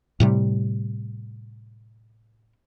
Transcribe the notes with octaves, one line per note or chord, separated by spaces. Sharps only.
A2 C3 G3